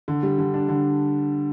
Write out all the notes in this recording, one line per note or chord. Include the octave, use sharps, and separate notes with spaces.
D3
G3
D3
D4
D3